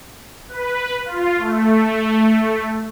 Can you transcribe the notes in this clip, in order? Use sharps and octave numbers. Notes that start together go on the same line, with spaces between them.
B4
F4
A3